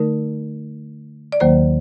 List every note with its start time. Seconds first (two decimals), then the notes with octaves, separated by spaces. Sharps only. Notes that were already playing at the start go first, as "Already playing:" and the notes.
Already playing: D3 A3 D#4 A#4
1.32 D5
1.40 D#2 D#3 F#3 A#3 C5